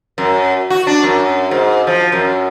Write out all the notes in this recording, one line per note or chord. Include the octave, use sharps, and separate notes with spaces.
F#2
F#4
D4
F#2
G#2
F3
F#2